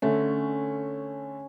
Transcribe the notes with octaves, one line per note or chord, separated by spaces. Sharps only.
D3 A3 C#4